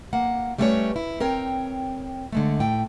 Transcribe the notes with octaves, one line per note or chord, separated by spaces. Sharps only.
A#3 F#5
G3 A3 B3 C#4 B4 C#5
E4
C4 A#4 C#5 G5
D3 G#3 A3
A2 G5